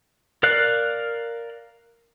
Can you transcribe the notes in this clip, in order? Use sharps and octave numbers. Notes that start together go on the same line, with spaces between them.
A#4 D5 F5 F#6